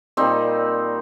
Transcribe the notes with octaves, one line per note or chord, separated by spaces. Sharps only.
A#2 G3 C4 D#4